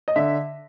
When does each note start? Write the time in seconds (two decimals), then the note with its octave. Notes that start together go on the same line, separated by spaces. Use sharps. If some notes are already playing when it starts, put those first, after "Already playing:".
0.08 D#5
0.16 D3 E5